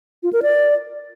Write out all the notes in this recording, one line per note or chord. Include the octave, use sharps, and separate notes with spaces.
F4
A#4
D5